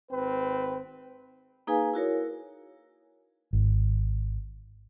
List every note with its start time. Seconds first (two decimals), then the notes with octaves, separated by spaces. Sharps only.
0.11 G#1 C4 B4
1.67 A#3 D#4 G#4 B4 F5 G#5
1.94 E4 F#4 A#4 C#5
3.53 G#1